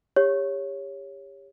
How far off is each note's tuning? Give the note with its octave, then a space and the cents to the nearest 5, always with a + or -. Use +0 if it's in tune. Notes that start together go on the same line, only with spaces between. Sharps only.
G4 +30 C#5 +0